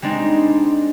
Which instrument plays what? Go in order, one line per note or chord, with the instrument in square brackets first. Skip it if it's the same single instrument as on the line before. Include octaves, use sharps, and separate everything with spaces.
[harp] G3 G#3 C4 D4 D#4